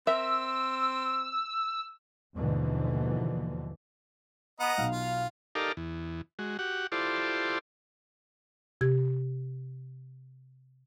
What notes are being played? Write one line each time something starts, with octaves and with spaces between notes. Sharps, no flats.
C4 A#4 E5 E6
D#2 G#2 B2 D3 E3 F3
B3 D#5 F#5 A#5
B1 B2 F5
F4
D#4 G4 A4 A#4 D5 F5
E2
G#3 F#4
F#4 G4 F#5
E4 F4 G4 A4 C5 D5
C3 G4 G#6